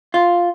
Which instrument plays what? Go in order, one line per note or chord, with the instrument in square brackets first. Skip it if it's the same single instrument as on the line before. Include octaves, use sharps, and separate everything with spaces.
[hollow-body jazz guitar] F4